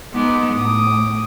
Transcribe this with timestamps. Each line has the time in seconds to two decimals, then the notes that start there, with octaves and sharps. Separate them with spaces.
0.14 G#3 B3 D#4 D6
0.54 A2 D6 D#6